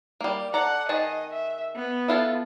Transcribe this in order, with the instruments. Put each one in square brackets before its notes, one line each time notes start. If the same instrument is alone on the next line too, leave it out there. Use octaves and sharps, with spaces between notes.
[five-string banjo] G3 A#3
[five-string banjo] A4 D5 A#5 [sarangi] F#5
[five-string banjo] D#3 G#4 A5 [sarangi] D#5
[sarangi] E5
B3
[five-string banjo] E4 F4 A4